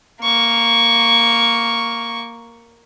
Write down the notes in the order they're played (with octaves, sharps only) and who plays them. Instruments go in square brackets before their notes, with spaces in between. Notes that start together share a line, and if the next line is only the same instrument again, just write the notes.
[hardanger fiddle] A#3 C#6